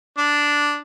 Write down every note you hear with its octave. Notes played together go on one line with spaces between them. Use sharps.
D4